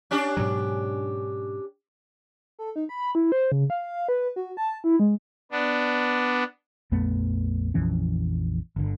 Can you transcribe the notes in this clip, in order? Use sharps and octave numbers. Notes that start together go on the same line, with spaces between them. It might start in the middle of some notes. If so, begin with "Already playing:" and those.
C#4 D4 G4
G#2 B2 F#3
A4
D#4
B5
E4
C5
C#3
F5
B4
F#4
A5
E4
G#3
B3 D4
A#1 F2 A3 B3
A#1 F2 E3 C#4
G1 D3